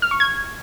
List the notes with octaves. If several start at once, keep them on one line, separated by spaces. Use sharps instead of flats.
F6
C#6
G#6